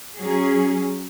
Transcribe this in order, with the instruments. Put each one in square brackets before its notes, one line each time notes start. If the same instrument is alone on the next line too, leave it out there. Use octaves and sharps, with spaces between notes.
[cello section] F#3 C#4 G#4